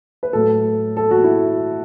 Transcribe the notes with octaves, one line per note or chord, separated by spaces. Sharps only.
B4
A2 F#3 A4
A4
F#4
E4